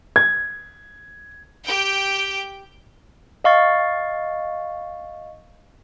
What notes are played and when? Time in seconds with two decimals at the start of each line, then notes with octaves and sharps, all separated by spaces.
0.16 G#6
1.64 G4 G5
3.44 D#5 F5 C#6 A6